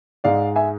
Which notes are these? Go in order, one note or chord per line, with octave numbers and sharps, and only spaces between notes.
G#2 G#3 D5 F5
E5 G#5